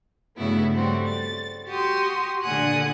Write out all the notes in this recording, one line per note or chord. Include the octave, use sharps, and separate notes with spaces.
G2 C#3 A3 B3 E4 F#4
G3 A3 C4 F#4
A6
F#4 G4 C6 D#6
A#2 D3 F#5 G#5 D#6 F#6